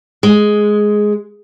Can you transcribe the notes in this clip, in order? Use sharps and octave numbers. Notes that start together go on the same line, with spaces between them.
G#3